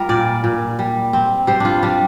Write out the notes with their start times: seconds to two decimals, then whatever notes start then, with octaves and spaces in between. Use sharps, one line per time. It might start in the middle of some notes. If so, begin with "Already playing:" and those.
Already playing: G3 F4 A#4
0.09 A#2 D5
0.44 A#2
0.79 G3
1.13 C4
1.47 G3 C5
1.60 D4 F4
1.83 G3 D4